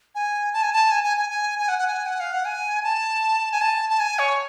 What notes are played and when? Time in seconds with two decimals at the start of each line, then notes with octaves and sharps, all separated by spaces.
0.15 G#5
0.54 A5
0.63 G#5
0.73 A5
0.91 G#5
1.04 G#5
1.18 G#5
1.30 G#5
1.59 G#5
1.68 F#5
1.79 F#5
1.87 G#5
2.06 F#5
2.20 F5
2.33 F#5
2.45 G#5
2.84 A5
3.52 G#5
3.61 A5
3.90 A5
4.00 G#5
4.19 C#5